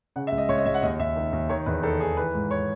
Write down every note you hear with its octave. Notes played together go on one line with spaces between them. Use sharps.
C#3 F#5
E5
C#2
D#5
C#2 C#5
D#5
C#2 E5
F#5
D#2 D#5
D#2 E5
D#3
D#2
D#3 C#5
E2 B4
D#3 A4
D#3 G#4
E3 B4
G#2
C#5